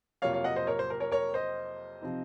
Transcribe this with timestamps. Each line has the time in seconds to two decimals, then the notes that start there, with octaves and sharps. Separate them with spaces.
0.22 F2 C3 F#3 A#3 F4 C#5 F5
0.33 C#5 F5
0.44 D#5 F#5
0.56 C5 D#5
0.67 A#4 C#5
0.79 C5
0.90 A#4
1.00 A#4 C#5
1.12 A#4 C#5
1.34 C5 D#5
2.02 C3 F3 C4 D#4